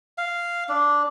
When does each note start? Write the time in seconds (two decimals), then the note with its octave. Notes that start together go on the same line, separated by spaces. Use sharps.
0.18 F5
0.69 D4